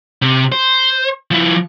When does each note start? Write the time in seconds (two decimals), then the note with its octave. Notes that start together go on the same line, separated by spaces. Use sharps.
0.22 C3
0.52 C5
1.31 F3 E4